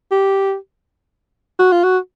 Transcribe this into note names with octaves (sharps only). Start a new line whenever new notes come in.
G4
F#4
F4
F#4